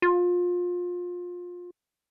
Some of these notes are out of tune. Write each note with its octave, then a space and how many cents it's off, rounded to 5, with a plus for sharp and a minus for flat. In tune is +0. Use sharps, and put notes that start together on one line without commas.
F4 +25